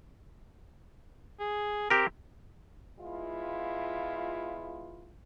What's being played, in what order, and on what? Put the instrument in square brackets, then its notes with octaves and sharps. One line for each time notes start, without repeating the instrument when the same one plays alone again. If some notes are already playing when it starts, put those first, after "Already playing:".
[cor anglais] G#4
[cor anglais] C4 [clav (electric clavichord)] G4 A#4
[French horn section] G#3 B3 E4 F4